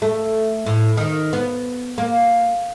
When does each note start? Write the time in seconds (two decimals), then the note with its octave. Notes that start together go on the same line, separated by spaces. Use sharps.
0.02 A3
0.66 A2
0.97 D#3
1.33 B3
1.98 A#3